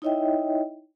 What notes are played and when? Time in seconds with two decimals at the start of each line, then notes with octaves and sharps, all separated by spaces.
0.02 D#4 E4 C#5 D#5 E5 G5